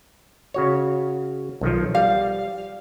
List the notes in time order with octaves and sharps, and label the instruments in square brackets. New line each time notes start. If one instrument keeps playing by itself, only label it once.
[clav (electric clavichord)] C#3 F#4 C#5
B1 D#3 F3
[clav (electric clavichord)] G3 [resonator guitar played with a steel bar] F5